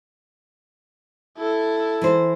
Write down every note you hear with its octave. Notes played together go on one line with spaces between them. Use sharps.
E4 A4
E3 C5